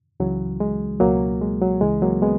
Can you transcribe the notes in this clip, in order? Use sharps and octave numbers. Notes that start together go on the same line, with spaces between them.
C#2 C#3 E3 F#3
G#3
C#2 B2 F#3 A#3
G#3
F#3
C#2 C#3 E3 G#3
F#3 A#3
G#3 B3